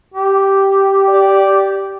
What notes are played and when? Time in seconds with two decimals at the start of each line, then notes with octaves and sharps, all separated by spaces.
0.14 G4
1.08 D5